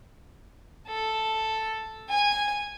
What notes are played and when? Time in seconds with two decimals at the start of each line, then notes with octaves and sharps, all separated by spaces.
0.87 A4
2.09 G#5